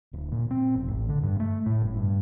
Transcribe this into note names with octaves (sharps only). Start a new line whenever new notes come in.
D1
A#2
C4
F1
A1
D3
G2
A3
A2
F#1
G2